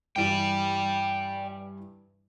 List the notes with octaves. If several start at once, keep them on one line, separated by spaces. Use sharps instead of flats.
G2 E3 E4 D5 G5